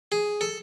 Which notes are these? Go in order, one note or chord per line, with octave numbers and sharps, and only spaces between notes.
G#4
A4